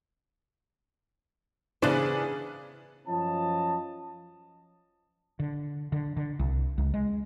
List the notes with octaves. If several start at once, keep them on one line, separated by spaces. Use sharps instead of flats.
C#3 E3 B3 D4 C5
F#2 F3 C#4 F4 D#5 A5
D3
D3
D3
C2
C#2
G#3